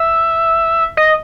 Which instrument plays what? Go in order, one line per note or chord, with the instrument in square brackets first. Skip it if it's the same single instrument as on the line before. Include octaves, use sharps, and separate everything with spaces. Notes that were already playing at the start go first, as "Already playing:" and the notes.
Already playing: [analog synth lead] E5
D#5